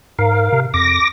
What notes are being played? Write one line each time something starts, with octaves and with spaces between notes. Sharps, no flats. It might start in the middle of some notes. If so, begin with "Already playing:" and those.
G#2 A#4 F5
C3
F2 D6 A#6